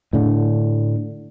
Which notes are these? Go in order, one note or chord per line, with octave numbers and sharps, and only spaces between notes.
A2 D3